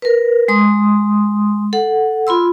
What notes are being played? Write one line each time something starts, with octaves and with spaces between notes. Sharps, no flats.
A#4 B4
G#3 C6 D#6
A4 F#5
F4 B5 C6 E6